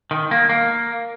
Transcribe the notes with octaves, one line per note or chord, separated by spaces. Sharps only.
D#3
A#3
A#3